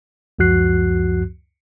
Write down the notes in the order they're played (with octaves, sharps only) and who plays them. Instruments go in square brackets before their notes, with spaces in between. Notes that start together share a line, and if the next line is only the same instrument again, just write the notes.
[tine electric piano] C#2 F#2 F3 F#4 F#6 C7